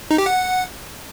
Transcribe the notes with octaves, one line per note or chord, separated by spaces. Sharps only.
D#4
G4
F#5